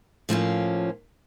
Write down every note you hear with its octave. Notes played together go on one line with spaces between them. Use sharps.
A2 F3 A#3 C#4